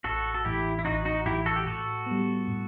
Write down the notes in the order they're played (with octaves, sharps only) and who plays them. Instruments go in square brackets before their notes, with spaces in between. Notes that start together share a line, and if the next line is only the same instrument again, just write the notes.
[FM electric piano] A1 [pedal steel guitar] F#4 A4
[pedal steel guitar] A4
[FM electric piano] A2 E3 [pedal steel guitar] E4 G4
[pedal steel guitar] E4
[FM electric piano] A1 [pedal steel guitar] D#4 F#4
[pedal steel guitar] D#4 F#4
[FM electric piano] A2 E3 [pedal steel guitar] E4 G4
[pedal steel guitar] F#4 A4
G4
[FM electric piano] A2 [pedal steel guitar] F#4 A4
[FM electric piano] G3 B3
A2